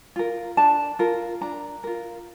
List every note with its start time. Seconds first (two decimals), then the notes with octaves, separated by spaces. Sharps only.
0.16 F4 A#4
0.57 D4 A5
0.99 F4 A#4
1.41 D4 A#5
1.84 F4 A#4